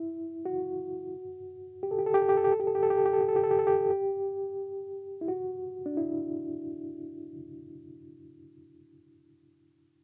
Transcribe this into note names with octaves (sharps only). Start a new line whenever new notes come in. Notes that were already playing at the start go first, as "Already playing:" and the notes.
Already playing: E4
F#4
G4
A4
G4
A4
G4
A4
G4
A4
G4
A4
G4
A4
G4
A4
G4
A4
G4
A4
G4
A4
G4
A4
G4
A4
G4
G4
E4
F#4
D4
E4